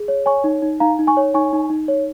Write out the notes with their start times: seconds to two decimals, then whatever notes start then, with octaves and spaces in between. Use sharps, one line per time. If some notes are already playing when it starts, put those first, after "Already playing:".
Already playing: G#4
0.08 C#5
0.26 C#5 G#5 C#6
0.44 D#4
0.62 D#4
0.80 D#4 F5 A#5
0.99 D#4
1.07 G#5 C#6
1.17 C#5
1.34 D#4 G#5 C#6
1.53 D#4
1.70 D#4
1.88 C#5